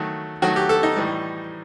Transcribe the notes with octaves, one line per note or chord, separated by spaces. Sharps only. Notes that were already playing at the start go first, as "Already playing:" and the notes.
Already playing: D#3 F#3 A3
D#3 F#3 A3 F#4
G4
A4
D#4
A2 E3 G3